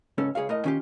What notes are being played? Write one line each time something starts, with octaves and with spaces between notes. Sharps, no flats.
C#2 G#2 C#4 A4
C#2 G#4 C#5 F5
A2 A#4 D#5
D#3 C#4 F4 G4